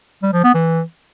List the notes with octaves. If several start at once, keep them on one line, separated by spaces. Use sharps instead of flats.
G3
F3
B3
E3